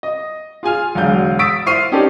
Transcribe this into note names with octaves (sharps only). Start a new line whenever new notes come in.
D#5
F4 G#4 G#5 F6
E1 B1 D3 F5 G6
C#6 D#6 E6 A6 B6 D7
E4 C5 C#6 F6 C7 D#7
C#4 D#4 G4 A4 C5 D5